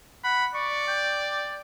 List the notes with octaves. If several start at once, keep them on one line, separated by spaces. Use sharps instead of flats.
F#5 B5
D5 C#6
G5